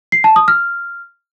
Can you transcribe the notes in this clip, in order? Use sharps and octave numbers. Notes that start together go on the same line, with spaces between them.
C7
A5
D#6
F6